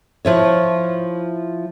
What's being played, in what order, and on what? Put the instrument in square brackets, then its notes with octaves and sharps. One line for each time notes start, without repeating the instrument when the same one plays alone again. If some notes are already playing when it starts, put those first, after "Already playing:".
[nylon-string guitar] F3 E4 C#5